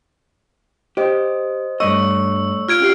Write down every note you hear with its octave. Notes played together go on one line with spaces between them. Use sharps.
G4 C5 D#5
G2 A3 C#5 D#5 C#6 E6
F4 F6 G#6 D7
C#4 G4 C7